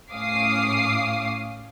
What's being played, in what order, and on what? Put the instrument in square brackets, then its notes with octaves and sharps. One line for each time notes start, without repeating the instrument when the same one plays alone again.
[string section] A2 C#4 F5 D6 D#6 C7